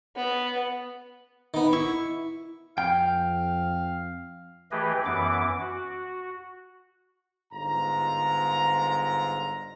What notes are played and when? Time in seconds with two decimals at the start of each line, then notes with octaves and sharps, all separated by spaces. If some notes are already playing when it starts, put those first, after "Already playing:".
0.16 B3
1.54 D#3 B3
1.73 E4 C#6
2.78 F2 F5 G5
4.71 E3 A3 G4 G#4 B4 D#5
5.05 F#2 E3 B3 D6
5.60 F#4
7.52 G1 G#2 F4 A#5